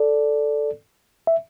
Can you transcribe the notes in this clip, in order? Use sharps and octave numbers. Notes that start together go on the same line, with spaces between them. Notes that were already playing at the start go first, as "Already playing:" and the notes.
Already playing: A4 D5
E5